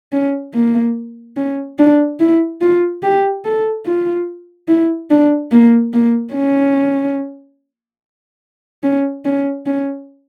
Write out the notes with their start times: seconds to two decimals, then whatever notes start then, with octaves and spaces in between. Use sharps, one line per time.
0.13 C#4
0.54 A#3
1.37 C#4
1.79 D4
2.20 E4
2.61 F4
3.03 G4
3.45 A4
3.86 F4
4.69 E4
5.10 D4
5.52 A#3
5.93 A#3
6.35 C#4
8.84 C#4
9.25 C#4
9.66 C#4